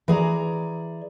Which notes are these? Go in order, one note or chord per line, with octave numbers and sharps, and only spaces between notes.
E3 G#4 D5 A#5